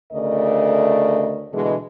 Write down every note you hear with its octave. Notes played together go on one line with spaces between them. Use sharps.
D2 C#3 A3 A#4 D5 D#5
B2 D3 E3 G#3